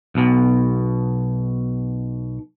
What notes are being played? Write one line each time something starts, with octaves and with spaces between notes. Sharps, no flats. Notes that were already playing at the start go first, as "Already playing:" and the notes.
B1 B2